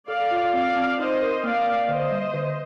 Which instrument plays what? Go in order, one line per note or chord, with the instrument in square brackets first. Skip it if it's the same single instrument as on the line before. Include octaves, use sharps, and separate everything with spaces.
[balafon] A4 [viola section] D5 F5
[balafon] F4
[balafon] C4 [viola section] D5 F5
[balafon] C4
[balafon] D#4 [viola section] C5 D#5
[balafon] A#4
[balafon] A#3 [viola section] D5 F5
[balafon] A#3
[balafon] D3 [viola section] C5 D#5
[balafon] G3
D3